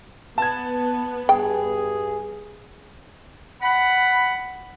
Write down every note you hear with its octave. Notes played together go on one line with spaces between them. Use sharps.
B3 A5 G#6
G2 G#4 G5
F#5 B5